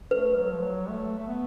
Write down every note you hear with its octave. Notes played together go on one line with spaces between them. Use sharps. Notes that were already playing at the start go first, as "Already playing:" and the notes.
A3 B4
F#3
F3
F#3
A3
A3
B3